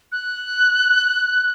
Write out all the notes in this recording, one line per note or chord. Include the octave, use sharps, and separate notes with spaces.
F#6